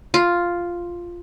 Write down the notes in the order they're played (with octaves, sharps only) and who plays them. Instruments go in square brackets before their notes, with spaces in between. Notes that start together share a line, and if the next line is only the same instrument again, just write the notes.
[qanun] F4